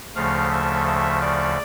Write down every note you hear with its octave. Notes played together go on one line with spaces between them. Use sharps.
D2 C#3 F3 A3 F5
E5
E5
D5